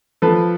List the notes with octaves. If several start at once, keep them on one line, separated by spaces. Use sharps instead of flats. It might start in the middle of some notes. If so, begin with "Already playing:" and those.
F3 A4 B4